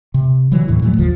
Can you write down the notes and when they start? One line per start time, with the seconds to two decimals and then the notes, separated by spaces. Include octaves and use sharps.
0.14 C3
0.52 D3 E3 F#3 G3
0.68 D#2 A2 D3 E3
0.82 A#2 F3 F#3 A3
0.98 F#1 D#2 D3 F3